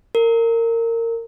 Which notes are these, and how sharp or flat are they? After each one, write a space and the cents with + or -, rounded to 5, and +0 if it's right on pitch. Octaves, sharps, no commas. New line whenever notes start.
A#4 -25